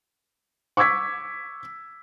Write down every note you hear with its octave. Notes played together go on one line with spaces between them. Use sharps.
C#6 D6 E6 G#6 B6